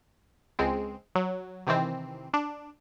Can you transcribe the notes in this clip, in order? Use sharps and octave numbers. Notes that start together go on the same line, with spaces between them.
C#2 G#3 C4
F#3
C3 D#3 E3 C4
D4